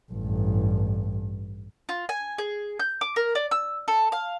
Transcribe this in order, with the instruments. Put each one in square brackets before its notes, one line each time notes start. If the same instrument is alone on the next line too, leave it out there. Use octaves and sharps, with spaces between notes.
[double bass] A1 G2
[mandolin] F4
G#5
G#4
G6
D6
A#4
D5
E6
A4
F5